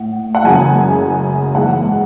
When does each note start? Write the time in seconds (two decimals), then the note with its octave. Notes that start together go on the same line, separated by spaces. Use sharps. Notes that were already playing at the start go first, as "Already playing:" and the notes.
Already playing: A2 F#5
0.35 F#5
0.44 F#2 C#3 E3 G#3 G#5
1.54 G#2 E3 G#3 F#5